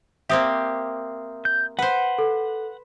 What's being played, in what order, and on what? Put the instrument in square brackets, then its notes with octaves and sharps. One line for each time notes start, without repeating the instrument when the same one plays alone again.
[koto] A#3 C4 G4 [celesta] E5 D#6
[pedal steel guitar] G6
[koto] B4 C5 [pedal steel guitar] F#5
[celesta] A4